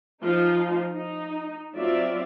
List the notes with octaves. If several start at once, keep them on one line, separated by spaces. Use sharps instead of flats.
F3 D#4 F4
D#4
F#3 C4 F4 D5 E5